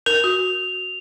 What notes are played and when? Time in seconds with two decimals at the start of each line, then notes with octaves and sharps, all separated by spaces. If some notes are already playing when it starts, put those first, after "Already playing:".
0.06 A#4 F7
0.24 F#4